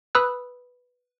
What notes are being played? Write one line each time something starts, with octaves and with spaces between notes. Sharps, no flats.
B4 B5 D#6 E6 F#6